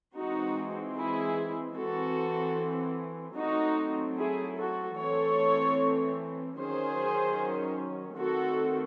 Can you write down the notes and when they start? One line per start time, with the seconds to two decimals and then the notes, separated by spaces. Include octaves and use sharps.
0.16 E3 G#3 C4 D#4 F#4
0.97 E4 G#4
1.77 E3 C4 F#4 A4
3.37 F#3 A3 C4 D#4 F#4
4.18 E4 G#4
4.57 F#4 A4
4.98 E3 A3 C4 A4 C#5
6.59 D#3 F#3 C#4 G#4 C5
8.19 D#3 A3 C4 F#4 A4